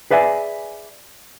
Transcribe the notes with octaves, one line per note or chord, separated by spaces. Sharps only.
G#4 B4 D5 E5 G#5